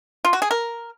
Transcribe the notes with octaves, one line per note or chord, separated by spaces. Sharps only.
F4
F#4
G#4
A#4